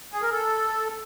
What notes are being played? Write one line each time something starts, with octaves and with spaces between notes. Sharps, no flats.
G#4
A#4
A4